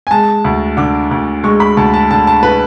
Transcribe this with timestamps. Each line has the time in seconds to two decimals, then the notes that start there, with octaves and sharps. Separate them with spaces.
0.07 G#5
0.11 G#3 A5
0.44 D2
0.77 D3 D6
1.11 D2
1.44 G#3 C#6
1.60 B5
1.77 D2 A5
1.94 A5
2.10 D3 A5
2.27 A5
2.43 B4